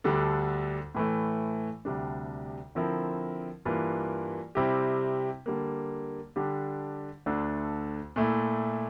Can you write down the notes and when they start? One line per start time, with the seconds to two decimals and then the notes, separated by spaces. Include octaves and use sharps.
0.04 D2 D3 G3 D4 A4
0.95 A2 E3 A3
1.85 D2 C3 G3 D4
2.75 D3 F3 C4 E4 A#4
3.65 G2 E3 A#3 F4
4.55 C3 G3 C4 E4 G4
5.46 D3 G3 A#3
6.36 D3 G3 D4 G4
7.26 D2 D3 A3 D4 A4
8.16 A#2 A3 E4